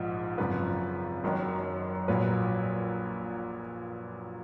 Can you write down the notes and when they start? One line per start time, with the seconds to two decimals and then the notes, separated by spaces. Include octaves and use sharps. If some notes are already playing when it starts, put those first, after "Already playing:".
Already playing: A#1 G#2 F3
0.38 G#1 F#2 C#3 F3 B4
1.23 F#1 F#2 D#3 F#3
2.08 A#1 A#2 F#3 B4